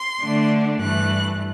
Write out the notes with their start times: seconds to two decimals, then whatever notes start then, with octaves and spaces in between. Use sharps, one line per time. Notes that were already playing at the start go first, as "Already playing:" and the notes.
Already playing: C6
0.21 D3 A3 D4
0.80 G2 E3 A3 F#6